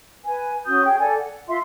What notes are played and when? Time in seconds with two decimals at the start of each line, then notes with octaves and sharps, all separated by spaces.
0.25 B4 G#5
0.66 C#4 F#4 D#6 G6
0.85 G#4 G5
0.99 A4 D5 G#5
1.19 F#5
1.48 F4 E5 C6